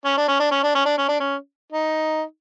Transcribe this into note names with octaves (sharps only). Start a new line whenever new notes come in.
C#4
D4
C#4
D4
C#4
D4
C#4
D4
C#4
D4
C#4
D#4